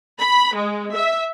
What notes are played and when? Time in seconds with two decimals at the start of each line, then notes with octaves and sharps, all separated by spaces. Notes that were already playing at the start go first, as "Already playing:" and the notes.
0.19 B5
0.56 G#3
0.94 E5